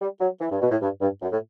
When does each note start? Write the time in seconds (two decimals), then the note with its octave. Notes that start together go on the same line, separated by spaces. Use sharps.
0.01 G3
0.20 F#3
0.41 E3
0.52 G2
0.62 B2
0.71 A2
0.82 G2
1.01 G2
1.22 F#2
1.32 A2